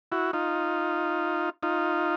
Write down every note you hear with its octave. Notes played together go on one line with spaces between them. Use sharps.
E4 F#4
D#4 F4
D#4 F4